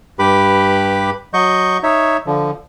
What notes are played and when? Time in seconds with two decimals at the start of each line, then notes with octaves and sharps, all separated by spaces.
0.19 G2 G4 B4 B5 D6
1.34 F#3 D#5 C#6 G6
1.83 D#4 C#5 E5
2.26 D3 F3